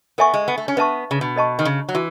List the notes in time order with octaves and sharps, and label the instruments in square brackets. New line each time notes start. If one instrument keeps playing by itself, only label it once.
[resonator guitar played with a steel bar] B3 [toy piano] A4 E5 G#5 C#6
[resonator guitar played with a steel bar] G#3
B3
A3
C#4
[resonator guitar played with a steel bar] B3 [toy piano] B4 E5 A5 C#6
[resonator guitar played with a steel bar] C#3
B2
[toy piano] A4 D#5 A5 C#6
[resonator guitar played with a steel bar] D#3
C#3
F#3
[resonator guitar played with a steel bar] E3 [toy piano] F#4